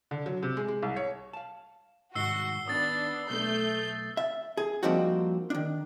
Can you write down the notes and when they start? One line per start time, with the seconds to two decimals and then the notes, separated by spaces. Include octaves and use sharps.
0.11 D3
0.26 F#3
0.43 C3
0.57 G#3
0.68 G#3
0.83 C2
0.96 C#5
1.33 F5 A5
2.15 C2 G#2 D#3 F#4 E6 C7 G7
2.68 D#3 B3 D4 D#6 A6
3.30 B1 A3 B3 G6
4.17 E5
4.57 G#4
4.83 F3 G3 A#3 C4 D#4 F#4
5.50 D#3 D4